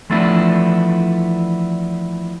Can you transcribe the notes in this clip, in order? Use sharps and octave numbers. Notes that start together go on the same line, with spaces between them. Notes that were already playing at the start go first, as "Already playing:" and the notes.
E3 F3 A3 B3 D4 E4